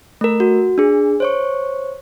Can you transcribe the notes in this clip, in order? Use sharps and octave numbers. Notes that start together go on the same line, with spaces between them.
A3 A#4
F#4
D4 G#4
C5 C#5 C#6